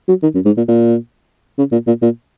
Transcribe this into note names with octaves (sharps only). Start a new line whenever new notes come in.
F#3
D#3
F#2
G#2
A#2
A#2
C#3
A#2
A#2
A#2